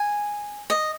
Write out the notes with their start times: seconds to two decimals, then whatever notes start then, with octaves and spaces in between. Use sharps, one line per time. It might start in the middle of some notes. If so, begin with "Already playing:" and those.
Already playing: G#5
0.70 D#5